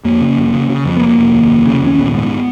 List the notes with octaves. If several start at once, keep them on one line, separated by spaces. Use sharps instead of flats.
F2 A#3
C#3
F1
C#3
C#3
F2
B3
F1 A#3
F1
D#2
F1
C#3
D#2 C#4
A#1 B3
G#2